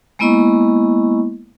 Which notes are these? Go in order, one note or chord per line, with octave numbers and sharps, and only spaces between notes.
G#3 A#3 B3 E4 D#5 C#6